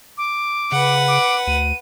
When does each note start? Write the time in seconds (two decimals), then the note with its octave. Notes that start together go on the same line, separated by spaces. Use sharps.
0.18 D6
0.72 C#3 B4 F#5
1.08 D6
1.47 D2 D#7